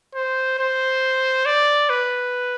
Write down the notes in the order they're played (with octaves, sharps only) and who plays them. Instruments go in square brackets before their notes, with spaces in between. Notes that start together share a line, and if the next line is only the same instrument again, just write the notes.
[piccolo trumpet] C5
C5
D5
B4